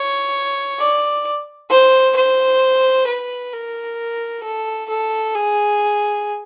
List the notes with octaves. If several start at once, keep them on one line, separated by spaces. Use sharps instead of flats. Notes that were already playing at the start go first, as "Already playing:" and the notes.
Already playing: C#5
D5
C5
C5
B4
A#4
A4
A4
G#4